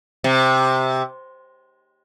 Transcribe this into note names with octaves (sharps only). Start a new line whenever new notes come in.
C3